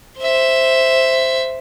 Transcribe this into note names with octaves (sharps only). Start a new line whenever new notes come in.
C5 E5